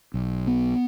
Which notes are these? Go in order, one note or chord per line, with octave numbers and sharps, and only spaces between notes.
B1
B3